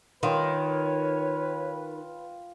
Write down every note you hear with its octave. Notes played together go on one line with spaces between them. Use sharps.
D#3 F4 B4 C#5 G5